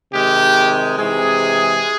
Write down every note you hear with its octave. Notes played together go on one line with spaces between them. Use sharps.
C3 D#3 G#3 G4
C3 E3 G#3 G#4